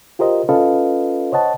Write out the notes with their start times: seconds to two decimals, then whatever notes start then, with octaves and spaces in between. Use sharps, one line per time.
0.19 F4 G4 A#4 C5 D#5
0.49 C#4 F4 A4 B4 D#5 F5
1.32 C5 C#5 D#5 F#5 A5